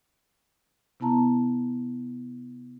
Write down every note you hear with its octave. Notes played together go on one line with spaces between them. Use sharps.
C3 B3 E4 A5 A#5